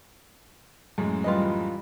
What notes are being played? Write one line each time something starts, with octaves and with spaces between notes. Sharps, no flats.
F#2 A2 G#3
E3 G3 F4 B4 D#5
E3